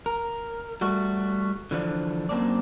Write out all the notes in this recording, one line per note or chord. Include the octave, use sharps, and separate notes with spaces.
A#4
G3 A3 F#4
D3 E3 F3 D4
F#2 A#3 C4 D4 D5